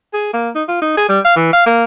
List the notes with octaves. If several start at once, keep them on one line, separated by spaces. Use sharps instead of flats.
G#4
A#3
D#4
F4
D#4
G#4
G3
F5
E3
F5
A#3